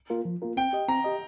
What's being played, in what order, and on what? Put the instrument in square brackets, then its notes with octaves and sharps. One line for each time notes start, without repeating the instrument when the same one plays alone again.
[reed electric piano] A#3 F4 A#4
F3
A#3 F4 A#4
[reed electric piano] C4 [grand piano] G5
[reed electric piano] G4 D#5
[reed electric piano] C4 [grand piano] A#5
[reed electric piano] G4 D#5